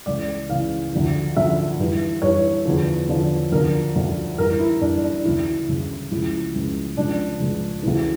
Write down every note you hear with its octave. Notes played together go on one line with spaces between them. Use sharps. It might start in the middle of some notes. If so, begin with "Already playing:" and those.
C#2 C#3 E3 D5
C#2 C#3 E3 F5
D2 D3 F3
D2 D3 F3 E5
G2 E3
G2 E3 C#5
E2 D3 F3
E2 D3 F3
D2 D3 F3 A#4
D2 D3 F3
G2 E3 A#4
E4
G2 E3 D4
D4
D2 C#3 E3 E4
D2 C#3 E3
C#2 C#3 F3 E4
C#2 C#3 F3
C#2 C#3 F3 D4
C#2 C#3 F3
D2 C#3 E3